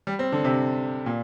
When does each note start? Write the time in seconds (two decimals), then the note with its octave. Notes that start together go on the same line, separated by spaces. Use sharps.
0.07 G3
0.19 C4
0.32 D3
0.44 C3
1.06 A#2